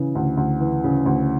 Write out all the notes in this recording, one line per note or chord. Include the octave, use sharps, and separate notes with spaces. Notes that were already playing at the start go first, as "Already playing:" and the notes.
Already playing: C#3 E3
D2
D2
E3
C#3
D2